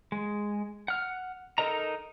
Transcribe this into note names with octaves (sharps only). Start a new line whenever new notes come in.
G#3
F#5 F6
D#4 A4 A#4 D#5 A#5